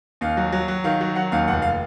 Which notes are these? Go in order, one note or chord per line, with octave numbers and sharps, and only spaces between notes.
D#2 F5
F#3
F#3
F#3
D#3 F5
F#3
F#3 F#5
D#2 F5
F1 F#5
F5